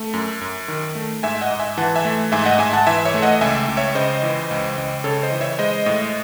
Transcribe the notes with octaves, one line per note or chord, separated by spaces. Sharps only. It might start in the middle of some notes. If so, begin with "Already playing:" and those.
Already playing: A3
F#2
F#2
D#3
A3
G#2 E5 G#5
D#5 F#5
G#2
E5 G#5
E3 F#5 A5
E5 G#5
A3
G#2 E5 G#5
D#5 F#5
G#2 E5 G#5
F#5 A5
E3 E5 G#5
C#5 E5
A3
D#5 F#5
C#2 E5 G#5
C#2
C#5 E5
C#3 C5 D#5
E3
C#2
C#2
C#3 A4 C#5
C5 D#5
E3
C#5 E5
G#3 C5 D#5
A2